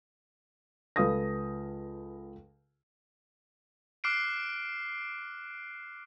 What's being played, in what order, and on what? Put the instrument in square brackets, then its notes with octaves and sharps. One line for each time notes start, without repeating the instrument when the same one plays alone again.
[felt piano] C#2 A4 B4 F5 D#6 A#6
[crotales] D6 F6 F#6 C7 D7